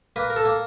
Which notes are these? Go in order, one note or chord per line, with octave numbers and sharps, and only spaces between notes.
A#3 B4
A#4
A4
A#3